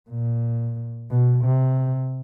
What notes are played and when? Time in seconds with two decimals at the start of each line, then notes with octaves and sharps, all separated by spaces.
0.10 A#2
1.11 B2
1.45 C3